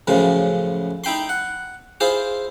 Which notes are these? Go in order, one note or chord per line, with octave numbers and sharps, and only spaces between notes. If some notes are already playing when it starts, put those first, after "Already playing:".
F#2 A2 C#3 F3
D#4 E4 G5 B5 C6
F#5
E4 F4 G#4 C5